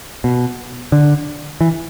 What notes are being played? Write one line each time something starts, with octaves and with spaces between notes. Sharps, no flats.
B2
D3
E3